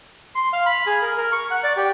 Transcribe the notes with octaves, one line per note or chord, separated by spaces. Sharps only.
C6
F5
B5
G#4
A#4
A#4
C#6
F#5
D5
G4